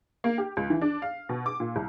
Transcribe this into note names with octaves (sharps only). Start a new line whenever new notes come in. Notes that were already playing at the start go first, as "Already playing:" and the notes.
A#3
G4
C#2
E3
D4
F5
B2
D6
A#2
C2